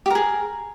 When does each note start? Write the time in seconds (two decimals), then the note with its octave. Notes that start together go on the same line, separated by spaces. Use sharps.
0.06 G4
0.10 A#4
0.15 G#4